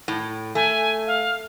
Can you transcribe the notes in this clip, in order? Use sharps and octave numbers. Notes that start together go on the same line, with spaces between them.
A2
A3 G#5
F5